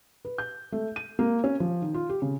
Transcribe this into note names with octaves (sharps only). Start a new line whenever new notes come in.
B4
G6
A3
D#7
A#3
C#4
F3
D#3
F4
G4
C#3